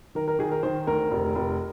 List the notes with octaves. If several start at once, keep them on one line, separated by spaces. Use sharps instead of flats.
D#3 A#4
A#4
D#3 G#4
A#4
D#3 C5
D2 A#4
F1
F1